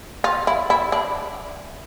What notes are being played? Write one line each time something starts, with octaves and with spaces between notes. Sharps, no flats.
F4
E4
E4
D4